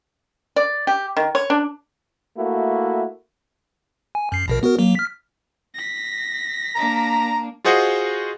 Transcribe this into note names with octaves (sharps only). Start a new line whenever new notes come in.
D5
G4
D#3
C#5
D4
A3 A#3 E4 F#4
G#5
F#2 C7
A#1 B2 A#4
B3 F#4 A#4
F#3 A#3
F6 B6
A#6 B6
A#3 D4 A#5
F4 F#4 G#4 C5 D#5 F#5